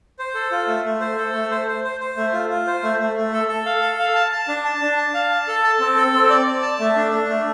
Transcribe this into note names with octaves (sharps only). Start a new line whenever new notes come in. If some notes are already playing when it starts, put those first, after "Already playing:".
C5
A4
F4
A3
A3
C5
A4
A3
C5
C5
C5
C5
A3
F4
F4
C5
A3
A3
A3
A4
A4
F5
A4
F5
A5
A5
D4
A5
D4
A5
F5
A5
A4
A5
C4
A4
C4
D5
D5
A5
A3
D4
D4
A3